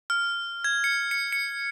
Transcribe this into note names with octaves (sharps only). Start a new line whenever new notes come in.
F6
G#6
C#7
C#7
C#7